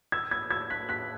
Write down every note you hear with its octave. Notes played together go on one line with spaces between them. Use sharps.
E6 G#6
E6 G#6
E6 G#6
F#6 B6
F#6 B6